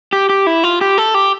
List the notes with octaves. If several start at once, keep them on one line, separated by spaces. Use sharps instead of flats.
G4
G4
E4
F4
G4
A4
G4